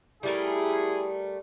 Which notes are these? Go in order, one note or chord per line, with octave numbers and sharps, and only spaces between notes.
G3 A3 E4 G#4 A#4